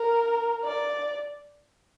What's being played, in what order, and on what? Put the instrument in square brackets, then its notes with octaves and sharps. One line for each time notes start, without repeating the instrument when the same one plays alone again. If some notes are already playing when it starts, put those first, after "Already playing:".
Already playing: [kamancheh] A#4
D5